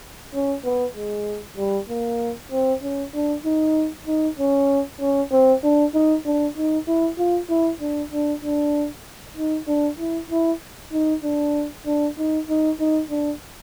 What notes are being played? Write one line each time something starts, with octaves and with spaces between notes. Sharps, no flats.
C#4
B3
G#3
G3
A#3
C4
C#4
D4
D#4
D#4
C#4
C#4
C4
D4
D#4
D4
D#4
E4
F4
E4
D4
D4
D4
D#4
D4
E4
E4
D#4
D4
D4
D#4
D#4
D#4
D4